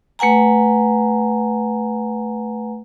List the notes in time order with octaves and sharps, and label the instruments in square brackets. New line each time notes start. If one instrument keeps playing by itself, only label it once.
[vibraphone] A3 B4 F#5 G#5 A#5